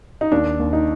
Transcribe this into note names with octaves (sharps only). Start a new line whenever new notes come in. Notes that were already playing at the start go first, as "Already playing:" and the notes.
D#4
D#2 D4
D#2
D#4